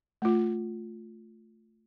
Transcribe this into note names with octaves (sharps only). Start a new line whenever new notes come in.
A3 F4